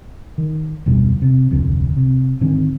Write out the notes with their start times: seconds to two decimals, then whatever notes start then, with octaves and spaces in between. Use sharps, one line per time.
0.38 D#3
0.86 F1 D2 B2 G3
1.22 C3
1.51 D1 C2 F2 D3
1.97 C3
2.41 G#2 D3 D#3 C4